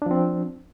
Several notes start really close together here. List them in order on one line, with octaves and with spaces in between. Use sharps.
D4 F3 C4